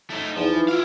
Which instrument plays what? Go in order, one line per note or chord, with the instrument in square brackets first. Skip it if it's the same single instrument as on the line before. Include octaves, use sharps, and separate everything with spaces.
[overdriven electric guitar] A3 D#4
[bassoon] E2 [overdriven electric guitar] F3 [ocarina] D#4
[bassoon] E3
[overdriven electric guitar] E4 F5 [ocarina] F4